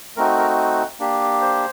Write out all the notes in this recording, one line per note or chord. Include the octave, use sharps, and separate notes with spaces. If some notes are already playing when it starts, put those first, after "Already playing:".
A3 C4 D#4 F#4 A#4
A#4
A#3 D4 G4
C5